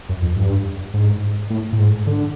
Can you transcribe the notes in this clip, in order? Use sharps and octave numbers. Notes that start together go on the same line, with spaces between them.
F#2
F2
G2
G#2
A2
A2
G#2
D3